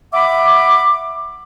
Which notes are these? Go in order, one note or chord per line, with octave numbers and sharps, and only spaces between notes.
E5 F#5 B5 D6